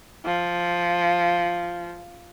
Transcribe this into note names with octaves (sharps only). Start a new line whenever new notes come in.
F3